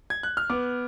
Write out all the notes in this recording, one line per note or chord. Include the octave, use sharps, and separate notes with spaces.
G#6
F#6
F6
B3 D6